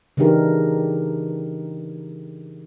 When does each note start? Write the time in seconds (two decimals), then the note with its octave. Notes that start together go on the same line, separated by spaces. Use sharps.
0.17 C#3 E3 D4 D#4 G4 A#4